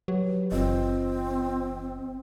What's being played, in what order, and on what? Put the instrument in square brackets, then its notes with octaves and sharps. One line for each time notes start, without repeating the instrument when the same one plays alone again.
[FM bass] F#3 [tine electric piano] G4 B4 C#5
[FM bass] F#1 [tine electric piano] E3 F4 D#5 [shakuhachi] C4